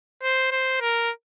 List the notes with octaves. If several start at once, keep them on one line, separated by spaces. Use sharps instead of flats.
C5
C5
A#4